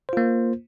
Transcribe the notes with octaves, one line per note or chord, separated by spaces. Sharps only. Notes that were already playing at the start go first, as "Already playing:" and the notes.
A#3 F4 C5